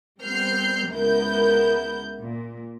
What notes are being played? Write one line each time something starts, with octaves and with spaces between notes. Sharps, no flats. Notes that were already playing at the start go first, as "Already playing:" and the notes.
G3 B3 C4 F6 G6 C7
C#2 C#3 B3 E4 A#4 G6
A#2